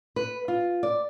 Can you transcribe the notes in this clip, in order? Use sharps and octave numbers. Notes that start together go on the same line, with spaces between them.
B4
F4
D5